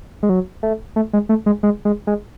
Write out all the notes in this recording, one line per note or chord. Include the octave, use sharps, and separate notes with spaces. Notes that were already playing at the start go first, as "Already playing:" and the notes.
G#3
F#3
A3
A3
G#3
A3
G#3
G#3
G#3
G#3